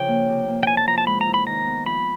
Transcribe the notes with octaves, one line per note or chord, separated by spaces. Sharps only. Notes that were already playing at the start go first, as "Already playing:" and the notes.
Already playing: C#3 F3 D4 G5
A#3
C3
A#3
G5
E2 G#5
A5
F3 A#5
A5
G#3 B5
A#5
E4
B5
D#3 A#5
B3
F3 B5